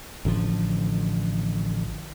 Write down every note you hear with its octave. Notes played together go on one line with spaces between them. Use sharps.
A1 D3 D#3 F3